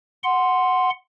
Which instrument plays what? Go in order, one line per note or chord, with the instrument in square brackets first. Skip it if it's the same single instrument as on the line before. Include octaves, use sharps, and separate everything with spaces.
[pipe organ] F#5 C6